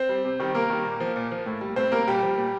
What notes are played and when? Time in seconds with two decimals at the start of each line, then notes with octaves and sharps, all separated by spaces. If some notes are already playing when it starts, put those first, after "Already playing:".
Already playing: C4 C5
0.09 G3
0.25 C3
0.40 D#3 G3
0.54 C3 A#3 A#4
0.70 D#3 G3
0.85 A#2
1.00 F3
1.16 A#2
1.32 F3
1.46 A2
1.61 G3
1.76 A2 C4 C5
1.92 G3 A#3 A#4
2.08 A#2 G3 G4
2.23 F3
2.37 A#2